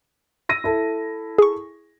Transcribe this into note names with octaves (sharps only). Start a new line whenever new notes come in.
E6 A#6 D#7
E4 A4
G#4 C#6